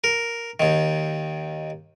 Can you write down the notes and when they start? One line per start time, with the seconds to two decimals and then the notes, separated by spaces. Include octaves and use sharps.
0.04 A#4
0.60 D#2 D#3